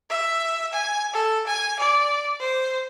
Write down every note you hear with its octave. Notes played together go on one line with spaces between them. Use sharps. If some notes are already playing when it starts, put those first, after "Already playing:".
E5
G#5
A4
G#5
D5
C5